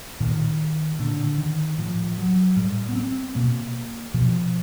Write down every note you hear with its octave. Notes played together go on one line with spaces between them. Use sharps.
A#2 D#3
A#2 D3
D#3
A2 F3
F#3
A2 G3
B3
C4
B2 A#3
B2 F3